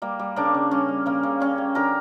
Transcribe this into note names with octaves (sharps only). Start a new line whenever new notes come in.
G3 A#3
G3
C#3 A#3 D4
C#3
G3 C#4
G3
C#3 A#3
C#3
G3 C#4
G3
D3 G4 A#4